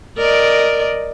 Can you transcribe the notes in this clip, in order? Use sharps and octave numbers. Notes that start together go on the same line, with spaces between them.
A#4 D5 D#5